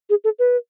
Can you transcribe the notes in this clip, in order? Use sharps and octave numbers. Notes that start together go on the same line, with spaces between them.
G#4
A4
B4